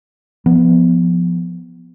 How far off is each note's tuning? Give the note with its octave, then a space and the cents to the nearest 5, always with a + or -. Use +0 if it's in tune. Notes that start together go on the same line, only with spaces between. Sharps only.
F3 +0 B3 +0